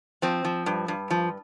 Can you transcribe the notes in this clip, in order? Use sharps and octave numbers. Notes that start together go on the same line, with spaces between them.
F3 C4
F3
G2
G2
F3